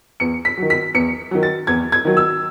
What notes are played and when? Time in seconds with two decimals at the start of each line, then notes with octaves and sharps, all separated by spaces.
0.20 E2 C#7
0.45 B6
0.57 D#3 F#3
0.70 B6
0.94 E2 C#7
1.31 D#3 F#3
1.43 A6
1.67 E2 G#6
1.92 G#6
2.05 D#3 F#3
2.17 E6